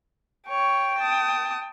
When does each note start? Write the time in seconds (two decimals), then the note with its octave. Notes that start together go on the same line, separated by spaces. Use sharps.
0.48 C#5 G5
0.98 A5 D#6